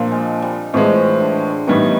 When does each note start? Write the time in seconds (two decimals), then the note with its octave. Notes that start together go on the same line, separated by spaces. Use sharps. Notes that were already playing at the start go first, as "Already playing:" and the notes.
Already playing: A#2 F3 A#3 C4 D4
0.12 G#3
0.42 G3
0.74 A2 E3 F3 G#3
1.20 D3
1.67 A2 D#3 E3 G3 B3 D#4